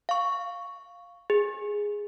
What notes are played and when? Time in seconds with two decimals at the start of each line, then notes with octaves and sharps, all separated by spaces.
0.09 F5 C#6
1.30 G#4